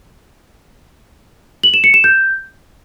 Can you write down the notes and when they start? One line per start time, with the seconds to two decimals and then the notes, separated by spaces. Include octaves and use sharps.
1.63 F#7
1.74 E7
1.84 C#7
1.94 E7
2.04 G6